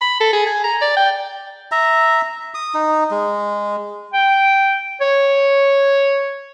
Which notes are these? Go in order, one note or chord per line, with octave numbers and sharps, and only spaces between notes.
B5
A4
G#4
G#5
A#5
D5
G5
E5 A#5
D#6
D#4
G#3
G5
C#5